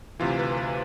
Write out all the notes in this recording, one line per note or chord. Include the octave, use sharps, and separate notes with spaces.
D2 C3 E3 F4
B4
B4